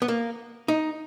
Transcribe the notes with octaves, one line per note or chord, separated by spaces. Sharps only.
B3
A#3
D#4